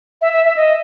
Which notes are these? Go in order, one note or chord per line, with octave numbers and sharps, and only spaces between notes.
E5
E5
E5
D#5